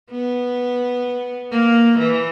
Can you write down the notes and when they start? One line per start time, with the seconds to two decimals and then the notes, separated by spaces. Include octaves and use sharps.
0.11 B3
1.52 A#3
1.99 E3